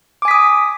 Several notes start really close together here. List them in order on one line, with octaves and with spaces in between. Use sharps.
D6 G#5 B6 D#6